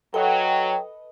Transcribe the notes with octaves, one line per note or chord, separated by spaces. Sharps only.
F#3 A4 B4 D#5 G5